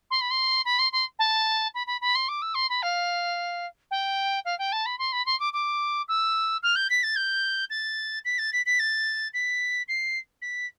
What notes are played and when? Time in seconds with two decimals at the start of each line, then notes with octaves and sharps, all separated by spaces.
0.10 C6
0.21 B5
0.30 C6
0.65 B5
0.78 C6
0.92 C6
1.19 A5
1.74 B5
1.87 B5
2.01 B5
2.15 C6
2.28 D6
2.41 E6
2.54 C6
2.69 B5
2.82 F5
3.90 G5
4.45 F5
4.58 G5
4.72 A5
4.85 B5
4.98 C6
5.12 B5
5.26 C6
5.39 D6
5.53 D6
6.08 E6
6.62 F6
6.75 G6
6.89 B6
7.03 A6
7.16 G6
7.70 A6
8.25 B6
8.38 A6
8.52 B6
8.66 B6
8.79 A6
9.33 B6
9.88 C7
10.41 B6